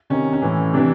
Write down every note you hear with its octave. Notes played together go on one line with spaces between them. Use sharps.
C3 D#3 C#4
C#4
A2 E3
C3 E3 D4